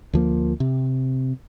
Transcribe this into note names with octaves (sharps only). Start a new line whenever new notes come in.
D2 F3 A#3
C3